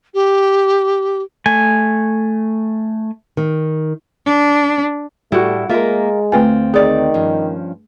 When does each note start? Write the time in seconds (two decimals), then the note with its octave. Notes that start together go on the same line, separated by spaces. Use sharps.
0.14 G4
1.46 A3 G#5
3.37 D#3
4.26 D4
5.32 A2 G3 A3 E4 F#4
5.70 G#3 A#3 F4 A#4 E5
6.32 D2 A3 C4 F4 B4 G#5
6.74 D#3 D#4 G#4 D5
7.14 G2 F3 C#4